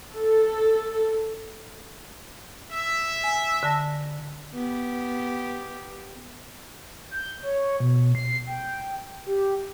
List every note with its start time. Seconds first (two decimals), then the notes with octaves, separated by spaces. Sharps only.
0.14 A4
2.72 E5
3.24 G#5
3.63 D3 A5 A#6
4.54 B3 G4
7.11 G6
7.43 C#5
7.80 B2
8.15 C7
8.47 G5
9.26 G4